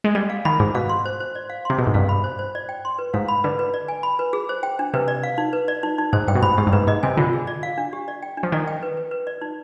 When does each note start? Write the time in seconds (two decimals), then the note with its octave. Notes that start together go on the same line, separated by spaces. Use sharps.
0.04 G#3
0.15 G3 D5
0.30 F5
0.45 D#3 B5
0.60 G#2 G#4
0.75 B2 F5
0.89 C6
1.05 C5
1.20 C5
1.35 D5
1.50 F5
1.65 C3 C6
1.78 B2 G#4
1.87 G#2
1.94 G2 F5
2.09 B5
2.24 C5
2.39 C5
2.55 D5
2.69 G5
2.85 C6
2.99 B4
3.14 G#2 F5
3.28 B5
3.44 D3 B4
3.59 B4
3.74 D5
3.88 G#5
4.03 B5
4.19 B4
4.33 G#4
4.49 C5
4.63 G5
4.79 D4
4.94 C3 B4
5.08 D5
5.23 F5
5.38 D#4
5.53 B4
5.68 D5
5.83 D#4
5.98 D#4
6.13 G#2 C5
6.28 G2 G5
6.35 B2
6.43 G#2 B5
6.58 G#2 G4
6.67 G2
6.73 G#2 B4
6.87 G#2 D#5
7.03 C3 G#5
7.17 D3 F4
7.33 G#4
7.47 D5
7.63 F5
7.78 D4
7.93 G4
8.08 D5
8.22 G5
8.37 D4
8.43 F3
8.52 D#3 D5
8.68 G5
8.83 B4
8.97 B4
9.11 B4
9.27 D5
9.41 D#4